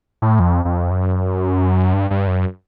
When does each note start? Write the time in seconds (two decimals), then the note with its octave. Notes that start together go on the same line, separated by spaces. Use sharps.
0.22 A2
0.40 F2
0.65 F2
0.91 F#2
1.93 G2
2.10 G2
2.27 F#2